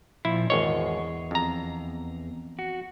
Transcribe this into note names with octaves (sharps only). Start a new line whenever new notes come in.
A#2 F3 E4
G#1 E2 G#4 C#5 D#5
F2 A#5
F#4